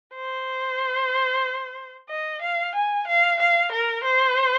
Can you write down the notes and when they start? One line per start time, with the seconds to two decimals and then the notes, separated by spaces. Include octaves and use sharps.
0.15 C5
2.10 D#5
2.42 F5
2.75 G#5
3.08 F5
3.40 F5
3.72 A#4
4.04 C5